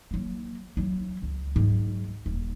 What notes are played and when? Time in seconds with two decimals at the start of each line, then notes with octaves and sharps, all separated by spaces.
0.11 F#3 A#3
0.77 F#3 E4
1.22 C#2
1.56 G#2 F#3
2.26 D#1